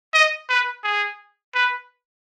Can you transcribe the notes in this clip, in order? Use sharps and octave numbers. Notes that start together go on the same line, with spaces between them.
D#5
B4
G#4
B4